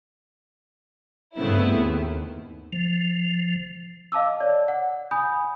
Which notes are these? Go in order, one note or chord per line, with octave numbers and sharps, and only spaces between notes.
G2 C#3 A3 B3 C4 E4
D#2
F3
D#5 F5 A5 D6 E6
C#5 D5
F#5
G#5 B5 D#6 G6